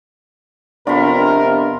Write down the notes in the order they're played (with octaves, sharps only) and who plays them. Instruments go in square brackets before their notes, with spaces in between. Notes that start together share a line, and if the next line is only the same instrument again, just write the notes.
[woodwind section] F2 C3 [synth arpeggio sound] B3 D4 [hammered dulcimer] F4 B5 [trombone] A#4